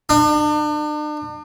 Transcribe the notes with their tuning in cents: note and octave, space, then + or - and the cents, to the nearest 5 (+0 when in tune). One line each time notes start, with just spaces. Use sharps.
D4 +40